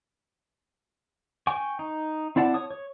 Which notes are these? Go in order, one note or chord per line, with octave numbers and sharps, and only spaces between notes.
G5 G#5 C#6
D#4
C4 E4 D5 F#5 A5
C#5 D#6
C#5